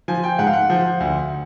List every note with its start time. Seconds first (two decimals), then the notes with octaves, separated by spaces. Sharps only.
0.08 F3 G#5
0.24 G5
0.39 G#2 F#5
0.47 F5
0.53 F#5
0.70 F3
1.00 D2